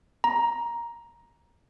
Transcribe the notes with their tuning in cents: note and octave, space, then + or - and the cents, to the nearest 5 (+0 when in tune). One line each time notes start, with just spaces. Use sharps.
A#5 +10